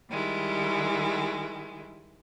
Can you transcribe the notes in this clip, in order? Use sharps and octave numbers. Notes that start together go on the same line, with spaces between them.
D#3 G3 G#3 E4